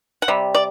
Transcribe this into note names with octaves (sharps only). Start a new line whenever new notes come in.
F#5
C3 G3
D5